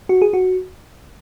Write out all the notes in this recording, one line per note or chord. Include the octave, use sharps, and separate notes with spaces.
F#4
G#4
F#4